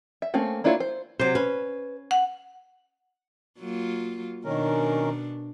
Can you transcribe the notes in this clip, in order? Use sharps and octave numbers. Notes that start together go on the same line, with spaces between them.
E5
A3 A#3 C4 C#4
A#3 D4 E4 F4 C#5
C5
C3 F#3 C5
C#4 B4
F#5
F#3 A#3 F4
B2 D#3 C#4 D4 A#4